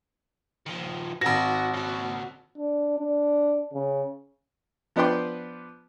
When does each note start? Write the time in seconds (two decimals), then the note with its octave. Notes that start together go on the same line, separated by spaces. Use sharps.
0.66 D#3 F3
1.21 G#1 F#4 F#5 A#6
1.74 C#3 F#4
2.58 D4
2.99 D4
3.74 C#3
4.96 F3 B3 D4 B4 G5 C6